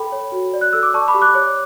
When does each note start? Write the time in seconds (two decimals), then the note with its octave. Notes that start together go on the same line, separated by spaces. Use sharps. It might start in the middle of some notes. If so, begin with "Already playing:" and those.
Already playing: A4 G5 B5
0.12 C#5
0.32 F#4
0.53 D5
0.61 F#6
0.73 A4 E6
0.83 D6
0.94 D5 A5 C#6
1.08 B5 D6
1.14 G4
1.22 D6 F#6
1.35 C#5